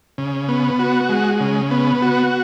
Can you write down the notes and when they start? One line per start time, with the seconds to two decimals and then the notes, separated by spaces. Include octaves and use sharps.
0.18 C#3
0.49 B3
0.79 F#4
1.09 G#3
1.41 C#3
1.71 B3
2.02 F#4